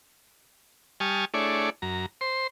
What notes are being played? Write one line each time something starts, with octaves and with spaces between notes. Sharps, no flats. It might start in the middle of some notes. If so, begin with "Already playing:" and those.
G3 G#5 A5 C#6 D#6 F6
A3 D4 E4 G#4 C#5 D5
F#2 A#5
C5 C6